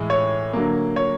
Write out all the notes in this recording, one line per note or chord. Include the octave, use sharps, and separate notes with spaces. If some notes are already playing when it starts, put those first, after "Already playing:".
Already playing: A2 E3 G#3
C#5
D3 F#3 A#3
C#5